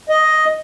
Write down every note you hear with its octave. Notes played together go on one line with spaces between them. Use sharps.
D#5